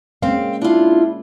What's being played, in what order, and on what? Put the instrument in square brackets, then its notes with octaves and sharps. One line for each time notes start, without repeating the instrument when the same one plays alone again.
[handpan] G#3 A#3 C#4 [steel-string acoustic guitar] C4 F5
[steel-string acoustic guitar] D4 F4 [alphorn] E4